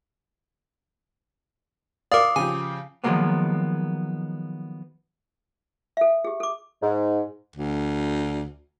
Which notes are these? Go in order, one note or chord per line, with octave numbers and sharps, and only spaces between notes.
A#4 D5 F5 D6 D#6
C#3 F3 G4 G#5
D#3 F3 F#3 G#3 A#3 B3
A4 E5
G4 G#4
A4 D6
G#2
D2